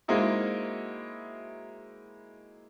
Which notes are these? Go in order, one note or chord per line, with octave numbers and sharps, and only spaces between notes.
G#3 A#3 C4 D#4 E4 F#4